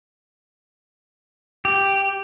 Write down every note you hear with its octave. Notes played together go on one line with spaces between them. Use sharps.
G4